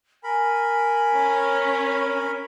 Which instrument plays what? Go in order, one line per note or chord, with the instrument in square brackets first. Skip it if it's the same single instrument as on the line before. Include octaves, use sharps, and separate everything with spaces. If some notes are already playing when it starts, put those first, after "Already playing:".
[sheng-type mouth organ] A#4 B5 [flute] G#5
[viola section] C#4